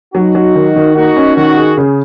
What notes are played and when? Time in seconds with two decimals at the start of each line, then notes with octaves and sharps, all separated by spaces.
0.14 F#3 D#4 F#4
0.35 F#3
0.55 D#3
0.76 D#3
0.96 A#3 D#4 F#4
1.17 C#4
1.37 D#3 D#4 F#4
1.57 G#4
1.78 C#3